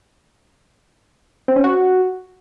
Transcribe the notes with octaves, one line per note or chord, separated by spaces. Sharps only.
C4
C#4
F#4